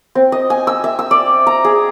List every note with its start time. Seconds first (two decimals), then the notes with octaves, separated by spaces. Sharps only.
0.15 C4
0.32 D#5
0.50 G#5
0.67 E6
0.84 E5
0.99 E6
1.11 D5
1.47 A#5
1.65 G#4